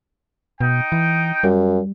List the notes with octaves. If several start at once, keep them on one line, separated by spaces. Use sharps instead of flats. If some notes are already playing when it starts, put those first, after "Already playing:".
B2 D#4 G5
E3
F#2 G3